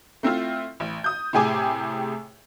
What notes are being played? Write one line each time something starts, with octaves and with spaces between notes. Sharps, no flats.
A3 C4 E4 F4
A1
D#6 G6
A2 C3 G4 G#4 G#5 D6